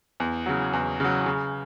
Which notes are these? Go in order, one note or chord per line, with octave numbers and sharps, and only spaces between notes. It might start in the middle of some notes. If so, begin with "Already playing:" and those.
E2
C#3 F#3
E2
C#3 F#3
C#3